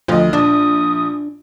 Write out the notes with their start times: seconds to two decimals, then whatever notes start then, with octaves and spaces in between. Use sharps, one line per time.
0.08 D2 F3 D#5
0.33 A#1 D4 D#6